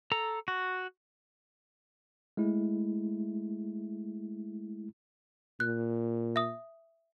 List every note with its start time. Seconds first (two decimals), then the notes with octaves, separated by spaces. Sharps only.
0.12 A4 A#5
0.48 F#4
2.37 G#3 A3 E4
5.60 A#2 F#6
6.36 E5 D#6